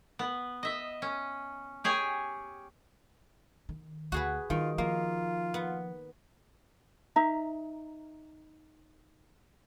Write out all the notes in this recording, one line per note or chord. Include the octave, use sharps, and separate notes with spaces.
B3
D#5 E5
C#4
G4 G#4 C#5 G#5
D#3
D2 F#4 G#4 B4
D#3 G3 F4
F3 A#3 F4
B3
D#4 E5 A#5